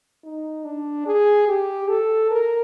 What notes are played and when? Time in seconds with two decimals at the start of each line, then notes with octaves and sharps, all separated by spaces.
0.24 D#4
0.65 D4
1.07 G#4
1.48 G4
1.89 A4
2.31 A#4